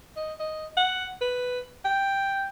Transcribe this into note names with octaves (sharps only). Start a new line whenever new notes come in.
D#5
D#5
F#5
B4
G5